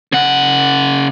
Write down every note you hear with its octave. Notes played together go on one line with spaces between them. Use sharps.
C#3 F#5